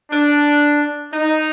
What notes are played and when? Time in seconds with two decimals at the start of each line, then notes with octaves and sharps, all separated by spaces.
0.11 D4
1.13 D#4